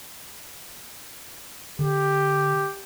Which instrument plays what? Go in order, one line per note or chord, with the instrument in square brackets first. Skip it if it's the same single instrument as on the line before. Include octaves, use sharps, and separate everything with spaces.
[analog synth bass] D3 [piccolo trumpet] G4